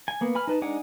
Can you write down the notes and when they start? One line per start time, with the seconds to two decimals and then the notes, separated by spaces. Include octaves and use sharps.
0.08 G#5
0.21 A#3 B3
0.35 B4 G#5 B5 F6
0.47 D#4 B4 A5
0.62 G#3 D4 D#4 F#5 G#5